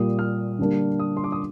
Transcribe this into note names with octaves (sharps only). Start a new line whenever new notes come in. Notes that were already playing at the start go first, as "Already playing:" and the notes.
Already playing: A#2 G3 A#3 D#6
F6
D3 G3 A#3 D4
D#6
C6
D6
D#6